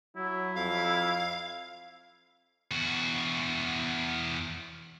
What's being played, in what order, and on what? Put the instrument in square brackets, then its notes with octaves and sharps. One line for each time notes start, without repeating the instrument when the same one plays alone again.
[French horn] F#3 [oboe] E4
[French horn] F2 [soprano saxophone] F5
[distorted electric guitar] E2 F#4